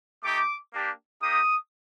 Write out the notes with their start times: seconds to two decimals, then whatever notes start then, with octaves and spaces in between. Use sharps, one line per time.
0.23 A3 D#4 G4 D6
0.73 A#3 D4 G4
1.22 A#3 D#4 G4 D#6